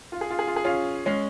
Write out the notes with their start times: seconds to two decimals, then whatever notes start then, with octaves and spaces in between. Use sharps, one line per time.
0.12 F4
0.21 G#4
0.30 F4
0.39 G#4
0.47 F4
0.56 G#4
0.65 C#4 F4
1.06 G#3 C#4